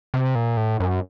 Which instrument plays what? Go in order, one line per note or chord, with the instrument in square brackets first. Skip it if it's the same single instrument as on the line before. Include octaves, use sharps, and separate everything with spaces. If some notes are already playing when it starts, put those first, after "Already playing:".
[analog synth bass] C3
A#2
A2
F#2